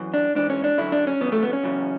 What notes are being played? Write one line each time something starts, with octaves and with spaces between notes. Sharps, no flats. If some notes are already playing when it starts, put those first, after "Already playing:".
Already playing: F#2 E3
D4
G#2 E3 D4
C#4
D4
F#2 D3 E4
D4
C#4
F#2 C#3 E3 B3
A3
B3
C#4
F#2 C#3 E3